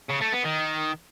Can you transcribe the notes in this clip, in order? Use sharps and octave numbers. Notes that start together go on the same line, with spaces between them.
C#3
A3
B3
D#3